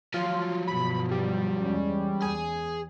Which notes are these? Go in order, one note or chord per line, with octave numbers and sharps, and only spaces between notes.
F3 F#3 F4
G2 B2 B5
G3
E2 G#3 C#4
E2 G#4